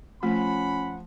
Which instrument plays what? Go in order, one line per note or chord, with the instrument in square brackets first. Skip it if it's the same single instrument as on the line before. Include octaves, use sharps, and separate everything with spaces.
[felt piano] F3 [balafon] A3 [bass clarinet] C#4 [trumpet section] F#5 B5